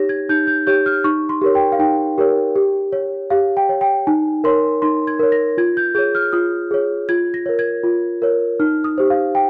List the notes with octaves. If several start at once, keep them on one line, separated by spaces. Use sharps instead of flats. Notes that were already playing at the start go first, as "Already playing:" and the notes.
Already playing: D#4 G4 C#5 A#6
G#6
D#4 G6
G6
G4 C#5 G6
F6
D#4 C#6
C6
G4 A#4 C#5
G5
F5
D#4 G5
G4 A#4 C#5
G4
C#5
G4 F5
G5
C#5
G5
D#4 G#5
A#4 C#5 C6
D#4 C6
G#6
A#4 C#5
A#6
F4 G#6
G6
G#4 C#5 G6
F6
F4 D#6
G#4 C#5
F4 G#6
A#6
A#4 C#5
G#6
F4
A#4 C#5
D#4 F6
D#6
G4 C5
F5
G5